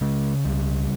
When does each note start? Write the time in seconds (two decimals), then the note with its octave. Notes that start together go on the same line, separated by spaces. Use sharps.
0.01 C#3 G#3
0.45 C#2 G3